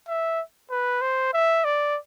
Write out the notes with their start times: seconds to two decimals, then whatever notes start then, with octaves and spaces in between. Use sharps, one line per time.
0.08 E5
0.70 B4
1.02 C5
1.34 E5
1.65 D5